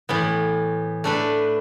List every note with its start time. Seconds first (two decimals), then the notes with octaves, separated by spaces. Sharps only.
0.09 A2 E3 B3
1.04 A3 D4 B4